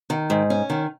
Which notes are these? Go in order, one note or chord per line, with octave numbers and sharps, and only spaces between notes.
D#3
G#2
C#4
D#3